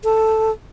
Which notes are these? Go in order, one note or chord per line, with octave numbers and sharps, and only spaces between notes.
A4